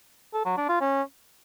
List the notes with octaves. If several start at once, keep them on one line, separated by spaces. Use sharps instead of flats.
A4
F#3
D4
F4
C#4